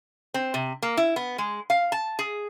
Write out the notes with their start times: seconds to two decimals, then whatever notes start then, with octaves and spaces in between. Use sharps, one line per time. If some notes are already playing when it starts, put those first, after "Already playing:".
0.34 C4
0.54 C3
0.82 A#3
0.97 E4
1.16 B3
1.38 G#3
1.70 F5
1.92 A5
2.19 G#4